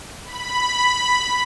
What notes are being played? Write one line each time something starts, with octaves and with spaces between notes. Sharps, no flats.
B5